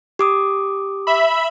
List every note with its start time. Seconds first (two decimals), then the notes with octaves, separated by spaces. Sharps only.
0.19 G4 D6 D#6
1.07 E5 B5